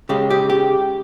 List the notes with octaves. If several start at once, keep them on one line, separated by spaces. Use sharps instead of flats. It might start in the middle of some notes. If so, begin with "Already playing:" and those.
C#3 G#3 G4
G4
G4